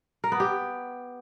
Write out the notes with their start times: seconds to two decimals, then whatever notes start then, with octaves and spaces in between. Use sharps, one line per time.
0.24 A#4
0.32 B3
0.40 G4